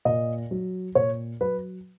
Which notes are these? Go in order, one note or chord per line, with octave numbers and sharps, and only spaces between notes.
A#2 D#5
F#3
A#2 C#5
F#3 B4